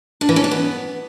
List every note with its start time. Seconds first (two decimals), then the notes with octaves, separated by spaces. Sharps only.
0.21 D4
0.29 E3
0.36 C#4
0.44 D4
0.51 B3